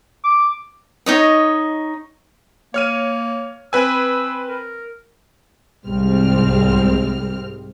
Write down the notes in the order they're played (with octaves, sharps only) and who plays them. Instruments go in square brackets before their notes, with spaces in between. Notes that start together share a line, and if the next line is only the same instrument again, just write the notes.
[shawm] D6
[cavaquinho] D#4 C#5 D#5
[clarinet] A#3 [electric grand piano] C#5 F6 D#7
[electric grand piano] C4 B4 G#5 [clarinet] E6
[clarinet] A#4
[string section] C2 G#2 G3 G#3 C4 F6